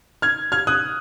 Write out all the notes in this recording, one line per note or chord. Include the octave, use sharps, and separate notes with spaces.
F6 G#6
F6 G#6
D#6 F#6